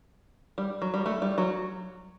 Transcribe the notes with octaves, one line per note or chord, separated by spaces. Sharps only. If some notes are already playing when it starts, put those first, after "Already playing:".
G3
F#3
G3
A3
G3
F#3